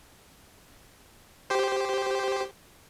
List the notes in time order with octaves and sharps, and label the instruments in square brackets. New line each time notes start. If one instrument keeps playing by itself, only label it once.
[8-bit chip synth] G4 C5